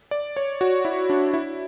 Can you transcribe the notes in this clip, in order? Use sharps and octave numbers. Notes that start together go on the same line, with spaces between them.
D5
C#5
F#4
E4
D4
E4